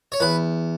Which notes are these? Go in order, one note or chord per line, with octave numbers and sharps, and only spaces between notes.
C#5
E2 B4